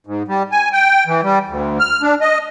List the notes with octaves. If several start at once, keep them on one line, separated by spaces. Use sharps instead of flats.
G#2
G3
G#5
G5
E3
G3
D2
F6
D4
D#5